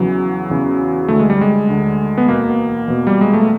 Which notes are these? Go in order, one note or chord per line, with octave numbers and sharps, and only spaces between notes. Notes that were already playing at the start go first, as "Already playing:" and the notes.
Already playing: E2 C#3 E3 F#3
E2 C#3 E3
D2 D3 A3
G#3
G3
G#3
D2 D3
B3
E2 B2 A#3
E2 B2
G3
G#3
A3